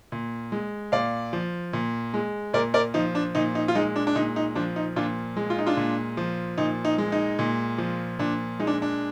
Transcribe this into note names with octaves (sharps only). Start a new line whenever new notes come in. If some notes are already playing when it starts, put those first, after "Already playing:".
A#2
G#3
A#2 D5 F5
F3
A#2
G#3
A#2 A#4 D5
A#4 D5
F3 D#4
D4
A#2 D#4
D#4
F4
G#3 D#4
D4
D4
A#2 D#4
D#4
F3 D4
D#4
A#2 D4 F4
G#3
F4
D#4
D4 F4
A#2
F3
A#2 D#4
D#4
G#3
D#4
A#2
F3
A#2 D4
G#3 D#4
D4
D4